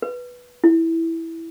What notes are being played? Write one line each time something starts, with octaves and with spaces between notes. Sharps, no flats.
B4
E4